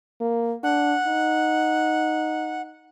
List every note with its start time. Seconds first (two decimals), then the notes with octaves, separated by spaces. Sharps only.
0.21 A#3
0.63 D4 F#5
1.07 D#4